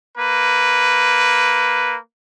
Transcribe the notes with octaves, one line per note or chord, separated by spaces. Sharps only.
A#3 B4